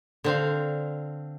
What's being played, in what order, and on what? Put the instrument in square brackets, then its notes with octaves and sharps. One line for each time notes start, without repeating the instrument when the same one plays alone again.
[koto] D3 C4 F5